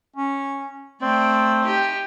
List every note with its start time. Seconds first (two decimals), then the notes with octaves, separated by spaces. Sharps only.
0.16 C#4
1.02 A3 C4 D5
1.63 D#4 G4